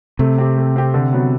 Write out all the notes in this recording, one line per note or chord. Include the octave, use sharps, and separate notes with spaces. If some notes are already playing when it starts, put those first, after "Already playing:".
C3 A3
C4 G4
A3
C4 G4
D3
F#3 B3